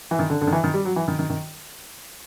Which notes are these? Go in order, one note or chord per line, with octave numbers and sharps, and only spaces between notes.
E3
D#3
D3
D3
D#3
E3
D#3
G3
F#3
E3
D#3
D#3
D#3